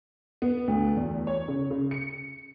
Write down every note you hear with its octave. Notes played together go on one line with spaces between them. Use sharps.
B3
D2
E2
C#5
C#3
C#3
C#7